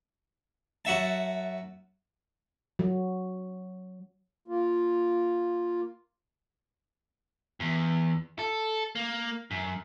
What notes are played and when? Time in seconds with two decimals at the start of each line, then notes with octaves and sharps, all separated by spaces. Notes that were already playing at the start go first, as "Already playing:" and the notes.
0.85 F#2 F#4 E5 A5
2.79 F#3
4.48 A#3 F4
7.60 E2
8.39 A4
8.95 A#3
9.51 F#2